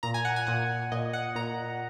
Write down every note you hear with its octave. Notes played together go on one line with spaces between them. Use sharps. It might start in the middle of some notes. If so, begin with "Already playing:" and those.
A#2 A#5
G#5
F#5
G#5
A#2 F#5
A#2 D#5
F#5
A#2 A#5